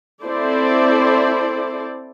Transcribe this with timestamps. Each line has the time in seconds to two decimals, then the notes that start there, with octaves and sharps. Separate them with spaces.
0.23 C4 E4 A4 C5 D5